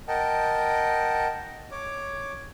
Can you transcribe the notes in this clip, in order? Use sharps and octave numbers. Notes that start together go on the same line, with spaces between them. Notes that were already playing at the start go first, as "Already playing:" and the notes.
A#4 D#5 F#5 G5 A5
C#5 D6